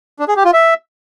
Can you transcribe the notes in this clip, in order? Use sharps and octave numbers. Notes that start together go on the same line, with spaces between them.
D4
G#4
G4
F4
E5